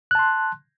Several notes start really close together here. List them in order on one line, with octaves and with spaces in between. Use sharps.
F#6 A5 C6